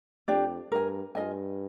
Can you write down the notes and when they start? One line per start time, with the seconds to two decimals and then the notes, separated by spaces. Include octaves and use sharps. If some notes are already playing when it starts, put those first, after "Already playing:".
0.28 F2 D4 G4 D5
0.71 G2 A#4 D#5 G#5
1.15 G2 F4 A#4 D#5 G#5